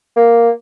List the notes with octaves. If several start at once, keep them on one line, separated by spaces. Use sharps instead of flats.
A#3